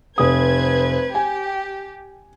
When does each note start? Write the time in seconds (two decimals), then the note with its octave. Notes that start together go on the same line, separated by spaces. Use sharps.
0.18 F1 B4 C5 D#6 G#6
1.15 G4 G#5